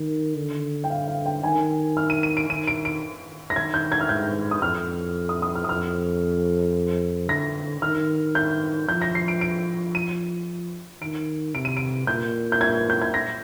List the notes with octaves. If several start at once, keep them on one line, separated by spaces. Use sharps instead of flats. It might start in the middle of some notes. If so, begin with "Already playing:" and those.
Already playing: D#3
D3
G5
F5
F5
G5
D#3 G#5
F6
D#7
D#7
D7
D#3 D#7
D7
D7
A#6
D#3 G#6
G6
G#6
F6
G#2 G6
D#6
F2 F6
D#6
D#6
F6
D#6
F2 F6
D3 A#6
D#3 F6
G6
F3 G6
A#6
C7
D7
D7
D#7
D#3 D7
C3 D7
D#7
D7
A#2 G6
G6
G#6
G6
G#6
A#6